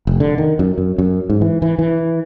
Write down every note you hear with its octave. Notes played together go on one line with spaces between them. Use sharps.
F1
D3
D#3
F#2
F#2
F#2
G#2
E3
E3
E3